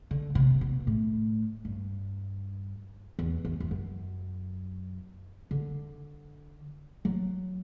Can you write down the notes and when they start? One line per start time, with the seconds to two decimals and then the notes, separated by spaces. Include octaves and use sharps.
0.11 D3
0.35 C3
0.61 B2
0.87 A2
1.65 G2
3.19 E2
3.45 E2
3.60 E2
3.71 F#2
5.51 D3
7.05 F#3